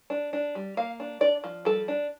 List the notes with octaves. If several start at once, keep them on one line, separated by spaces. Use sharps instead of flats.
D4
D4
G3
A#3 F5
D4
D4 D5
F3
G3 A4
D4